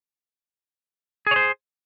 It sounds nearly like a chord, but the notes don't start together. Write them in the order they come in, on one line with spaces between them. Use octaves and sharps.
G#4 C#5 C5